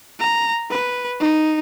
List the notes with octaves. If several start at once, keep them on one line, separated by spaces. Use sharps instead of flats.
A#5
B4
D#4